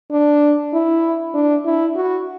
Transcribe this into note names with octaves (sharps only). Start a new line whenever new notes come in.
D4
E4
D4
E4
F#4